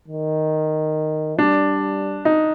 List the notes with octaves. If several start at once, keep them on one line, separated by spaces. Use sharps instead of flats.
D#3
G3 D4
D#4